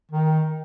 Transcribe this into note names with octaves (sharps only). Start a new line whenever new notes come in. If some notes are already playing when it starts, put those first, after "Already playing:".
D#3